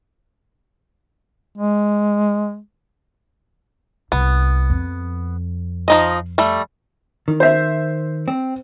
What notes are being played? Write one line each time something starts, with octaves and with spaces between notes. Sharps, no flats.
G#3
C2 B3
F2
F3 D#4 D#5
G3 A3
D#3
C5 E5
C4